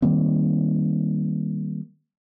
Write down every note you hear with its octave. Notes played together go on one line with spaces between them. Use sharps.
D#3 G3 A#3 C4